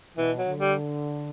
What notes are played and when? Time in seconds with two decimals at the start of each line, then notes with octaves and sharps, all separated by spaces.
0.17 B2 E3
0.38 F#3
0.48 D3
0.59 G3